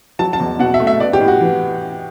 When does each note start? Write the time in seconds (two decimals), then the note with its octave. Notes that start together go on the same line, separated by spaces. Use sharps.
0.19 F#3 A5
0.33 A5
0.40 E2
0.59 B2 F#5
0.74 E5
0.80 A3
0.87 E5
1.00 B3 D5
1.13 G4
1.20 A2
1.28 F#4
1.40 E3